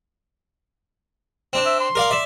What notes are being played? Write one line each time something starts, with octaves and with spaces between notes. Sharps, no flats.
C4 D4
E5
C6
A#4 D5 F5
D5 E5